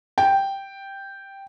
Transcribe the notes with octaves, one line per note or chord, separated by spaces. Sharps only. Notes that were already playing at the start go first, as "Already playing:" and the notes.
G5